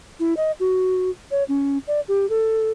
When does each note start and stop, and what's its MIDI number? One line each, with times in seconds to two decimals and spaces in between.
0.20 0.34 64
0.37 0.52 75
0.60 1.10 66
1.31 1.43 73
1.49 1.78 61
1.88 2.00 74
2.08 2.28 67
2.30 2.72 69